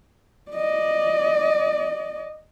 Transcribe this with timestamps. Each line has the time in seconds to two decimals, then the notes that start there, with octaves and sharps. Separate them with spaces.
0.51 D5 D#5